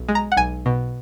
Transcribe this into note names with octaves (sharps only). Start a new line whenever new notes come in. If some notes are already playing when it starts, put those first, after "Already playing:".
Already playing: B1
G#3
A#5
F#5
B1 G#5
B2